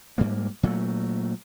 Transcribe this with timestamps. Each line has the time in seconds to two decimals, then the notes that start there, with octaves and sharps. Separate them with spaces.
0.18 G#2 G3 A#3
0.63 A#2 F#3 A3